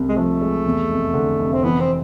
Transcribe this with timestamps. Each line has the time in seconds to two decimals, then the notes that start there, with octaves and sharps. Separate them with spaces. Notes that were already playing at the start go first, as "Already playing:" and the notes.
Already playing: C2 C3
0.08 G#3
0.16 F3 A3
0.41 G#3
0.66 E2
0.89 F1
1.14 D3
1.39 F1
1.53 C4
1.63 E3 B3
1.80 C4